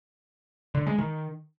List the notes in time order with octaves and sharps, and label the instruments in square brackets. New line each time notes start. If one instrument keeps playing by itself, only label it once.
[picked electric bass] D3
G#3
D#3